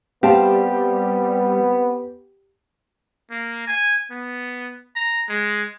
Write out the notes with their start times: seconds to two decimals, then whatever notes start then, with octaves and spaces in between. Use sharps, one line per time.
0.23 G3 B3 C4 G4 F5 A5
3.31 A#3
3.67 G#5
4.11 B3
4.96 A#5
5.29 G#3